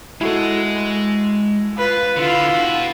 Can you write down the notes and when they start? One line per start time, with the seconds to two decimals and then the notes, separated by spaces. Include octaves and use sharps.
0.21 G#3 E4 F#4 A4 D#5
1.77 F4 B4
2.16 D3 E4 F4
2.54 F#4 B4